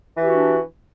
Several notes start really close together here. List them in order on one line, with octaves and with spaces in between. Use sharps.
E3 G4 F#4 D4